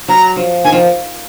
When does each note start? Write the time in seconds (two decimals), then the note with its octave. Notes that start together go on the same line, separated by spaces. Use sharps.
0.08 F#3 A#5
0.36 F3
0.64 D#3 G#5
0.72 F3